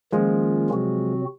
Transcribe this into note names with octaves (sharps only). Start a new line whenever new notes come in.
D#3 F3 G#3 A#3 C#4 F4
C3 F#3 C4 F#4